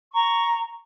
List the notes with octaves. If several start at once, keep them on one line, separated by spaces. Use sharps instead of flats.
A#5 C#6